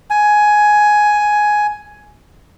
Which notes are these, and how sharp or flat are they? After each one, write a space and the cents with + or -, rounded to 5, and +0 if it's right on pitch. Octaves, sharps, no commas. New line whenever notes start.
G#5 +10